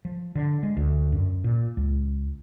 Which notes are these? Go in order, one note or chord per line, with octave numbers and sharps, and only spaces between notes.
F3
D3
G#3
D2
F#2
A#2
C#2